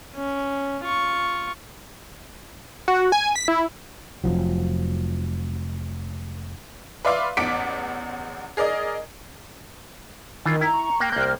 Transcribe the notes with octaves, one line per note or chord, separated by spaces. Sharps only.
C#4
F4 C#6
F#4
G#5
B6
E4
F1 C2 F3 F#3
B4 D5 E5 F5 C6 D6
A1 E2 D6 B6 C#7 D7
G#4 A#4 D5 D#5
D#3 E3 F4
E4 A#5
C#6
A#3 G5 F#6 G6
C2 A#3 C5 F6